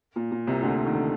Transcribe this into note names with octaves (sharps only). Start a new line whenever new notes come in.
A#2
A#2
C2 C3
D2 D3
D#3
D3